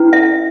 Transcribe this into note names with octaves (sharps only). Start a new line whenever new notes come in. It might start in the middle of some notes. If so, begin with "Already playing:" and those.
Already playing: C#4 E4 B4
E5